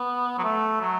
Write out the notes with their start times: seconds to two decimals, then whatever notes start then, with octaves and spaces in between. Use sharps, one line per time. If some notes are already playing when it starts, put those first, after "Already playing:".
Already playing: B3
0.38 F#3
0.44 A3
0.81 F#3